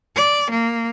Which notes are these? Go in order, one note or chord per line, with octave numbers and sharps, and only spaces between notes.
D5
A#3